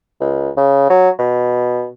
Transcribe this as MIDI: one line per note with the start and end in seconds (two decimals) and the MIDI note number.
0.20 0.49 37
0.57 0.85 49
0.90 1.10 54
1.19 1.88 47